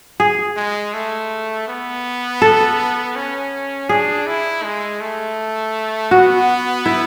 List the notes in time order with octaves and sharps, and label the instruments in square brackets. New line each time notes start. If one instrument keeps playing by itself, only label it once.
[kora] G#4
[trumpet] G#3
A3
B3
[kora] A4
[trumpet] C#4
[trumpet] D4 [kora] G#4
[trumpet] E4
G#3
A3
[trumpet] B3 [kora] F#4
[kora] E4